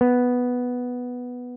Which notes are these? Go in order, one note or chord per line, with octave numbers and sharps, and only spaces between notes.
B3